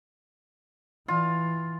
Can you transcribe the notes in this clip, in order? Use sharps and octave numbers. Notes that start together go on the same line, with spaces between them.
E3 F4